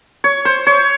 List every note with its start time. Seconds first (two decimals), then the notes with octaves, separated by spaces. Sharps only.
0.24 C#5
0.45 C5
0.67 C#5